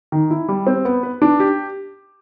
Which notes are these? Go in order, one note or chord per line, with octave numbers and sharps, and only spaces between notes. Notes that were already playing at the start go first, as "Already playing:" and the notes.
D#3
E4
G3
C4
B3
B4
D4
G4